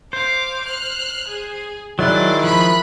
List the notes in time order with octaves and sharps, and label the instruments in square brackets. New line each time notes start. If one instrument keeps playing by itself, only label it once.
[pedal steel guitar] C5 [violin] F5 D6
[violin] F6 F#6
G#4
[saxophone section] D#3 G#3 E4 [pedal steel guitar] F#3 D5 F#6 [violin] C6 D6
[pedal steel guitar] F3 [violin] B5 F#6